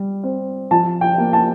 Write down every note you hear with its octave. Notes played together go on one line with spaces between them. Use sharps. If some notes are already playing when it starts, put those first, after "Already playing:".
Already playing: G3
C4
F3 A5
G5
A#3
A5